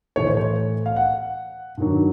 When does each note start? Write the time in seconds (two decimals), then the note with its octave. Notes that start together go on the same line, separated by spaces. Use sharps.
0.16 A2 E3 A3 C#5
0.26 C5
0.37 C#5
0.86 F5
0.96 F#5
1.77 G2 D#3 F#3